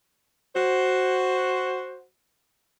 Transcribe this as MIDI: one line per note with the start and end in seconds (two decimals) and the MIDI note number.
0.55 2.02 66
0.55 2.02 72